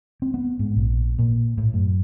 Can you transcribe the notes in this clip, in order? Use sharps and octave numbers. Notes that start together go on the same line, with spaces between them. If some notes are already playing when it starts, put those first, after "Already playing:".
C4
B3
G#2
A#1
A#2
A2
F#2